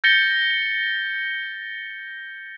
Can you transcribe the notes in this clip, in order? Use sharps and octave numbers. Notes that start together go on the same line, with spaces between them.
G6 A6 A#6 C#7 G7